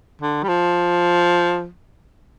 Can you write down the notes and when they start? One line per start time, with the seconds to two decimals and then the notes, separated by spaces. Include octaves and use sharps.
0.22 D3
0.44 G3
0.49 F3